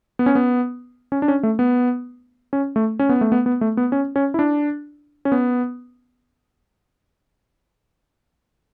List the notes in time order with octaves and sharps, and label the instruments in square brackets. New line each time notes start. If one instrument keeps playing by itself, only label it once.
[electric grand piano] B3
C#4
B3
C#4
D4
C#4
A3
B3
C#4
A3
C#4
B3
A3
B3
B3
A3
B3
C#4
C#4
E4
D4
C#4
B3